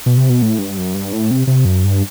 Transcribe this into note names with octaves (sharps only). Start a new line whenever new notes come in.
B2
C3
B2
A2
G2
F#2
G2
A2
C3
C3
F#2
G2